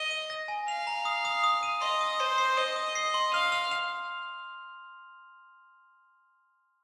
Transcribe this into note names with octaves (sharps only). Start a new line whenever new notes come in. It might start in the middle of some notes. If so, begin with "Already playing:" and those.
Already playing: D#5
D#7
A#6
G#5
F5 F7
A#5
D#6
D#6
D#6
D#7
D#5 C6
D#6
C5 C7
C7
D#5 D#6
D#6
C7
C6
F5 F6
F6
F7